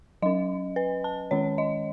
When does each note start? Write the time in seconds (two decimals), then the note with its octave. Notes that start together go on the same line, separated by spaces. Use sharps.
0.22 F#3 C#4 D#5
0.76 B4
1.04 A5
1.31 D#3 G#3 C#4 C#5
1.58 D#5